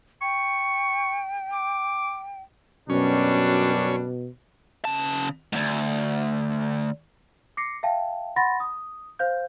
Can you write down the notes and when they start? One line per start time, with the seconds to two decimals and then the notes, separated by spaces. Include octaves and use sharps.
0.22 G5 C#6
1.53 D6
2.90 F#2 B2 G3 C#4 D4
4.85 C#3 A5
5.53 D2 G#2
7.57 D6 A#6 C7 C#7
7.83 E5 F5 G5 A5
8.36 F#5 B5 C6 A6 A#6
8.60 D#6
9.19 C5 F5 G6